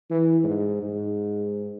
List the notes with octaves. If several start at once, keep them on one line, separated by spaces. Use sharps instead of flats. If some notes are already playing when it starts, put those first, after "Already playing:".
E3
G#2
G#2